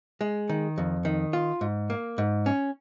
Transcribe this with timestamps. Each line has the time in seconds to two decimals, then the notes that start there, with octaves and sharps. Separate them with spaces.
0.21 G#3
0.49 D#3
0.78 F2
1.05 D#3
1.33 F4
1.61 G#2
1.90 A#3
2.18 G#2
2.46 C#4